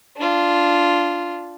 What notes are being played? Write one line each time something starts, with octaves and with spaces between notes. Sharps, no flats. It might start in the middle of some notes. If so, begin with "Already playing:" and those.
D4 F4